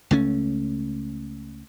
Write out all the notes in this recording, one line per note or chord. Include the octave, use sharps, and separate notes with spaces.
C#2 A3 C#4